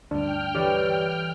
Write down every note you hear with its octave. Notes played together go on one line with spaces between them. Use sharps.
D2 G2 D4 G5 F6
E3 G3 G4 A4 C#5 D5